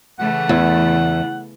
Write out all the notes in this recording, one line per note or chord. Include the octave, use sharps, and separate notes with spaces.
C#3 E3 A3 F#5
E2